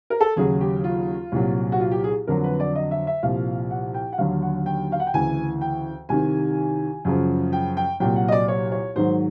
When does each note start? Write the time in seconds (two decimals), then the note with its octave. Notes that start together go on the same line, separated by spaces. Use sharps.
0.10 A#4
0.21 A4
0.36 D#2 C#3 F#3 G#4
0.61 G4
0.84 F4
1.32 C2 A#2 F#3
1.72 F#4
1.80 F4
1.91 G4
2.04 G#4
2.27 F2 D3 F#3 A#4
2.44 B4
2.60 D5
2.75 D#5
2.91 E5
3.07 E5
3.23 C2 A#2 F3 F5
3.71 F#5
3.94 G5
4.13 F#5
4.18 D#2 D3 F#3 F5
4.42 F#5
4.66 G5
4.92 F5
5.00 F#5
5.07 G5
5.14 D2 C#3 E3 G#5
5.61 G5
6.09 C2 C3 D#3 G#5
7.05 F#2 C#3 F3
7.53 G5
7.77 G5
8.00 C2 A#2 F#3 G5
8.16 F#5
8.28 D#5
8.32 D5
8.48 C#5
8.72 C#5
8.96 G#2 D#3 F#3 C5